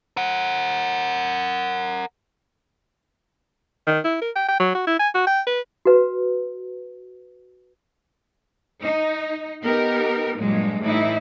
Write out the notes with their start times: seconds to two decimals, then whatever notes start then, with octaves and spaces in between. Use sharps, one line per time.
0.17 A#4 F#5
3.87 D#3
4.05 E4
4.22 A#4
4.36 G5
4.49 G5
4.60 F#3
4.75 F#4
4.87 E4
4.99 G#5
5.14 F#4
5.27 G5
5.47 B4
5.85 F#4 B4
8.81 D#4
9.63 B3 D#4 G4 A#4
10.37 G2 A#2 F#3 G#3
10.82 A2 E3 D#4 E4